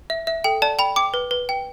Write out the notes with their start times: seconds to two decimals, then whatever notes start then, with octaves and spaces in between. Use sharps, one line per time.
0.10 E5
0.27 E5
0.44 A4 G5
0.62 D5 A5
0.79 G5 B5
0.96 G5 D6
1.14 B4
1.31 B4
1.49 G5